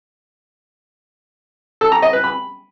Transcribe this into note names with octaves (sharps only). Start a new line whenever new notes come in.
A4
A#5
D#5
B4
B5